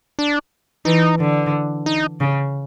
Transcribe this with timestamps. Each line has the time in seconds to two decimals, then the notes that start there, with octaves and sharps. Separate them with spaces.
0.19 D4
0.85 E3 D#4
1.19 D3
1.86 D#4
2.21 C#3